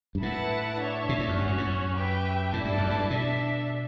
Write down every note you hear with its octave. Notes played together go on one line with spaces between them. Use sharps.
G2
A2 E4 B4 F#5 A5
D4 A4 C#5 E5
B2
A2
F#2
G2 C#4 F#4 C#5
F#2
A2
F#2
G4 B4 E5 G5
A2 E4 A4 D5 A5
G2
F#2
G2
B2 D4 A4 E5